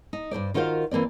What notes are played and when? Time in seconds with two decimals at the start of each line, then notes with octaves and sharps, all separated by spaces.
0.13 D#4
0.31 G2 C3 C5 D5
0.54 D#3 F4 F#4 A#4 C5 F5
0.91 E3 A#3 C4 D5